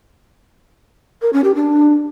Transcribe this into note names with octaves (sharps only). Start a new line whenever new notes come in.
A#4
C#4
G4
D4